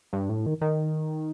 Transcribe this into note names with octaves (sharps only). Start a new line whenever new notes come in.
G2
A2
D#3
D#3